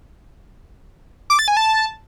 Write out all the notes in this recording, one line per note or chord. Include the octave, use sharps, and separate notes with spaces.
D6
A6
G#5
A5